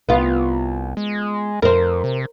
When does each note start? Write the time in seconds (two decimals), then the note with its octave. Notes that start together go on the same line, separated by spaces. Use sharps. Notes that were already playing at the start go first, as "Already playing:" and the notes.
0.09 C2 B3 F4
0.97 G#3
1.62 F2 A#4 C5
2.04 C3